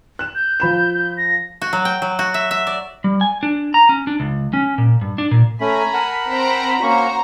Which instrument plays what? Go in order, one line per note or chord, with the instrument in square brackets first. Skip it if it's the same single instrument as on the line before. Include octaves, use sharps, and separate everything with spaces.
[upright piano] F#6 E7
[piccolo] G6
[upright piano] F3 B5 E7
[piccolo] A#6
[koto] F#4
F#3
G5
F#3
F#4
E5
E5
D5
[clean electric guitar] G3
G#5
D4
A#5
C#4
D4
C#2
C#4
A#2
G2
D4
A#2
[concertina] A3 C#4 [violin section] G#5 A#5 [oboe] B5
[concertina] A#4 F#5 A5
[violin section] C4 C5 A#5
[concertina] A#3 C#4 [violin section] F#4 C5 A#5 [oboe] C#6